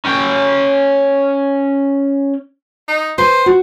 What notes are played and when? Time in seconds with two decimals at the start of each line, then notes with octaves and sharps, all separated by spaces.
0.05 C#4 G5
2.88 D#4
3.18 B4 C5
3.46 F#4